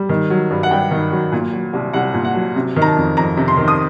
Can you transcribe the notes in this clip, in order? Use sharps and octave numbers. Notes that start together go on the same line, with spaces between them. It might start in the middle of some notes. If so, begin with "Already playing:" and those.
Already playing: G3
D#3
F#3
G2
F#5
G2 G5
D#3
F#3
A#2
F#3
C2
C2 F#5
A#2
F#5
F#3
C3
D#3
A#5
A5
F2
F2 A#5
C3
C6
D#3
D#6